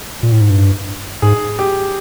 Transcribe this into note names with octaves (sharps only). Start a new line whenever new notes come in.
A#2
A2
G#2
G2
G#2 G#4
G4